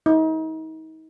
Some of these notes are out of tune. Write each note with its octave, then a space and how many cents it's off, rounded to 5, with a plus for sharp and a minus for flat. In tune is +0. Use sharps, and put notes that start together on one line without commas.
D#4 +35